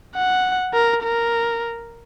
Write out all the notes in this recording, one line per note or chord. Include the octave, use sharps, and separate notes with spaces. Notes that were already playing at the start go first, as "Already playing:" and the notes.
F#5
A#4
A#4